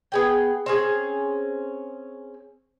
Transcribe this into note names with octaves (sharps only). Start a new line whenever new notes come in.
B3 G#4 G5
C4 C#4 G#4